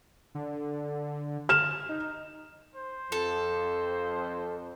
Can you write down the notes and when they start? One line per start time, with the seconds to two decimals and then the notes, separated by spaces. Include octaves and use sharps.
0.35 D3
1.49 F6 E7
1.89 D#4
2.76 C5
3.12 F2 A4